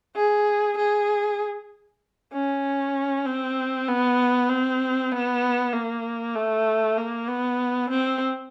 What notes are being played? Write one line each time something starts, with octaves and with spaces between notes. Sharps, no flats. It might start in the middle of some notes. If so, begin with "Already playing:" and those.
G#4
G#4
C#4
C4
B3
C4
B3
A#3
A3
A#3
B3
C4